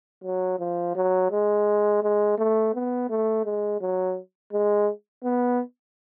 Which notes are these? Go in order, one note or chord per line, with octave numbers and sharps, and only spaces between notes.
F#3
F3
F#3
G#3
G#3
A3
B3
A3
G#3
F#3
G#3
B3